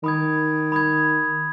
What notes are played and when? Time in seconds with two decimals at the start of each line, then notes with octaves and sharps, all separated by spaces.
0.03 D#3 B5 D#6 G#6
0.72 B5 D#6 G#6